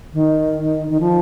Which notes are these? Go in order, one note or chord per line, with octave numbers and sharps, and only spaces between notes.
D#3
D#3
F3